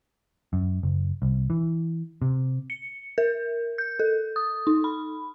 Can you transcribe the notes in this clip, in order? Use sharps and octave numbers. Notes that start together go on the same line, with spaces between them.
F#2
F#1
C2
E3
C3
C#7
A#4
G6
A4
D#6
D#4
B5